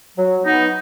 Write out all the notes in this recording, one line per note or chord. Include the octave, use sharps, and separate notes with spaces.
F#3
B3 D#4